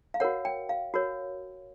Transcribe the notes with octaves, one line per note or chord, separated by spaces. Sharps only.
F5
F#4 A#4 C#5 F#5
G5
F5
F#4 A#4 C#5